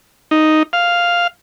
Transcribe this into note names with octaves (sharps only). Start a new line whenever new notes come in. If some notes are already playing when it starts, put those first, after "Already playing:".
D#4
F5